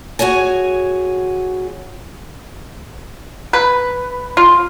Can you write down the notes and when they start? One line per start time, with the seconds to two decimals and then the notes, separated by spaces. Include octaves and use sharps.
0.19 F#4 G#4 C#5 G#5
3.53 B4
4.37 F4